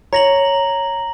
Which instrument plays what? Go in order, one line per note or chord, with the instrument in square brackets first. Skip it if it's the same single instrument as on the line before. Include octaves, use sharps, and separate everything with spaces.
[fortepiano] C#5 [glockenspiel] A#5 A#6 F#7